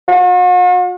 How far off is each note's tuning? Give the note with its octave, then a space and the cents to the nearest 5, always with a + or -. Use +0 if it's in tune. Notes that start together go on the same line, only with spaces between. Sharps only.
F#4 -45